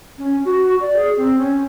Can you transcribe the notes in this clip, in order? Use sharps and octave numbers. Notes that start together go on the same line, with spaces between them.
C#4
F#4
D5
G#4
C4
C#4